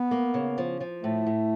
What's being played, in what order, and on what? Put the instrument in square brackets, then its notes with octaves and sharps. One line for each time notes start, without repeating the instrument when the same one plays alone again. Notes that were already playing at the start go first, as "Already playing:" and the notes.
Already playing: [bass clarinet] B3
[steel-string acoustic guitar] A#3
C#3
F3
F3
[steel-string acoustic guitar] A2 [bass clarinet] A3
[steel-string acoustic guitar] A2